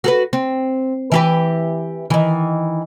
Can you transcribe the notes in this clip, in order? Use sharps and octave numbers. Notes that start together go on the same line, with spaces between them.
F#4 A4 B4
C4
E3 G4 B4
D#3 E3